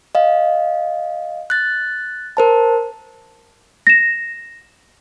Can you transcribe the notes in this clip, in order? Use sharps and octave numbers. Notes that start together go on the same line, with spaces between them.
D#5 F5
F#6 A6
A#4 C5 A5
A#6 E7